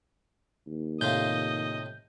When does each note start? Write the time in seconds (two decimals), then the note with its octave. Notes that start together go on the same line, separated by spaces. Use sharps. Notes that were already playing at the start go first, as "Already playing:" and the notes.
0.67 D#2
1.01 A2 C3 F4 D#5 G6